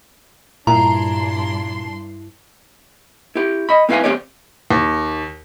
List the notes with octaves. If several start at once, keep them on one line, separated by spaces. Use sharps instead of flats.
G2 A#2 D4 E4 A#5 C6
E4 G4
D#5 B5
C4 E4 B4 F5 G5 G#5
C4 G4 G#4 C#5 D5
D#2